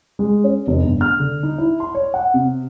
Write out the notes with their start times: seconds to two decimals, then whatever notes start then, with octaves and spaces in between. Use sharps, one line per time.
0.19 G#3
0.44 C#4
0.67 F1
0.84 G1
1.01 F6
1.20 D3
1.43 D#4
1.58 E4
1.80 C6
1.95 C#5
2.14 F#5
2.34 C3